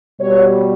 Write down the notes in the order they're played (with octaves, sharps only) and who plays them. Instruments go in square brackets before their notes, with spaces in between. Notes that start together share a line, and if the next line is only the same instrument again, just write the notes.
[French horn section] B2 G3 B3 C#5